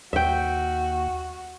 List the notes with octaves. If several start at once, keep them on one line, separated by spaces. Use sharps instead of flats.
D#2 F#4 E5 G5